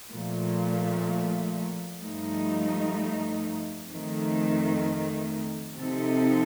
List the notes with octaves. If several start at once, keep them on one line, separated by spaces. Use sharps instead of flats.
A#2 F3 A3
G2 F3 A3 D#4
F2 D#3 A3
C3 F3 C4 D#4 A4